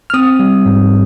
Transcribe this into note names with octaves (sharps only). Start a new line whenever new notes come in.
F6
C4 D#6
G3
G#2